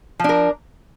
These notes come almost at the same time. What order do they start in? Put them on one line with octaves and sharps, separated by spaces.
F3 D4 A#4